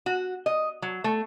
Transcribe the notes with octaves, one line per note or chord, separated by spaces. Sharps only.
F#4
D#5
F#3
A3